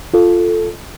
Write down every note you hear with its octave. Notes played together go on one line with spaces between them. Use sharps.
F4 A4